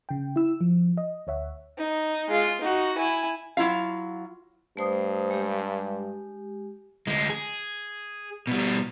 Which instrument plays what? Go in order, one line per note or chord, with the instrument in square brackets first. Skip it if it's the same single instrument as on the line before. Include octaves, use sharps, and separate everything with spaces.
[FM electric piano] C#3 G5
E4 E6
F3
D#5
D2 C#5 E5 F#5
[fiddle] D#4
G#3 F4
D#4 F#4
E4 G#5
[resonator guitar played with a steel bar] F#3 E4 F4 F5
[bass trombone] G2 [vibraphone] A3 C5 D#6
[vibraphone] G#3 G4
[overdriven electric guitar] D2 G#3
G#4
B2 G3